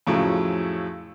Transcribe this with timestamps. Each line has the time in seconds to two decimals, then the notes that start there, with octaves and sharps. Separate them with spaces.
0.07 F2 A2 C#3 F#3